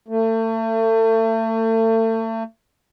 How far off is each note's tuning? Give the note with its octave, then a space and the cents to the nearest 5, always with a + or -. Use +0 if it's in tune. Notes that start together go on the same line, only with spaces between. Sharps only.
A3 +35